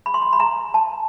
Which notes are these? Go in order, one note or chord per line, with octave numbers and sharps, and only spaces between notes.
B5
C6
B5
B5
A#5
A5